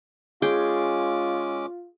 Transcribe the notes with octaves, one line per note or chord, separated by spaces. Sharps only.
G#3 C#4 F4 G#4 G5 D6